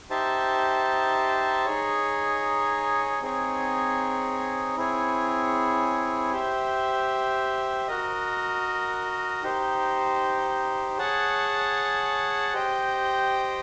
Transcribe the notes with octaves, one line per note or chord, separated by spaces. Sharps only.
D#4 G4 C5 E5 A5
D#4 G#4 C#5
C4 D#4 G#4 C#5
C4 E4 G#4 C#5
G4 C5 E5
F#4 A#4 D#5
D#4 G4 C5
G#4 C#5 F#5 A5
G4 C5 D#5 G5